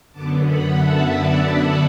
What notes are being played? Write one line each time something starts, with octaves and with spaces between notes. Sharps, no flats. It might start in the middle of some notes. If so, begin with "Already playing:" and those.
F#2 D3 B3 A5 D6
F#5 B5
E5 A5
D5 F#5
D5 F#5